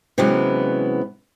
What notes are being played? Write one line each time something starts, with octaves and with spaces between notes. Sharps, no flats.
C3 E3 F#3 G#3 B3 C#4